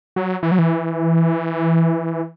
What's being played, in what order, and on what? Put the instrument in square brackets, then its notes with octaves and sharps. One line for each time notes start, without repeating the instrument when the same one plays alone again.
[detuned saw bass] F#3
E3
F#3
E3